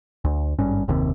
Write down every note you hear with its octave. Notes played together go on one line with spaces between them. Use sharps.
D2
G#1 G2 C#4
F#1 D#2 C3